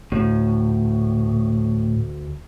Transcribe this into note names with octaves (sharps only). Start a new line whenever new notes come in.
D2 A2